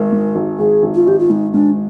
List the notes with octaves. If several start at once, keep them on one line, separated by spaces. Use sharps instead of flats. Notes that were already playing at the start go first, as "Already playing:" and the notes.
Already playing: G#1 G#2 A#4
G#2
G#1
G#1 G#4
G#1
F4
G#1 G4
F4
G#2 D#4
G#2 D4